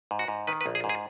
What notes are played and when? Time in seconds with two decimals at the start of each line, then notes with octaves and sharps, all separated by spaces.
0.11 G#2
0.19 F#4
0.28 G#2
0.47 D#3 B4
0.61 B4
0.66 A#1
0.75 G#4
0.84 G#2
0.89 G#4